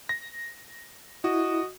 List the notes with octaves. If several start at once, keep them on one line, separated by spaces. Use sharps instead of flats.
A#6
E4 F#4 D#5